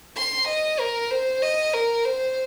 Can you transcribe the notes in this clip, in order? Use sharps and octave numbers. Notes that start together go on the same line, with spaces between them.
C6
D#5
A#4
C5
D#5
A#4
C5